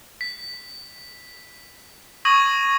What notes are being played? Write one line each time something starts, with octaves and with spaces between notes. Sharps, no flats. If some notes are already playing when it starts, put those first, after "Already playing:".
B6
C#6 D#6 G#6 A#6 D#7 F#7